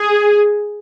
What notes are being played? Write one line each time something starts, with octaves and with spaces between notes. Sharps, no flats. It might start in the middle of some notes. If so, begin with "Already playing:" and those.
Already playing: G#4